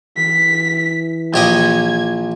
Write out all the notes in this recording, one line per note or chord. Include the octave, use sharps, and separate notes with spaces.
E3 B6
A#1 G4 D#5 G#6